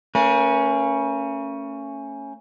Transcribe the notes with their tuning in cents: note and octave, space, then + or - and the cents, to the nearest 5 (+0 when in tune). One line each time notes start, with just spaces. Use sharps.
A3 +40 C#4 +0 B4 -45